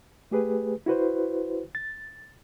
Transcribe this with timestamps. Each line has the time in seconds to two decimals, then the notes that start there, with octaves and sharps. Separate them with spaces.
0.31 A3 G4 G#4 B4
0.86 E4 F#4 B4 C5
1.75 A6